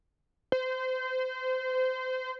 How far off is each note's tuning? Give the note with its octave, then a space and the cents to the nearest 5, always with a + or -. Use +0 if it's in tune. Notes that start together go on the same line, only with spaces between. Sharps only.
C5 -25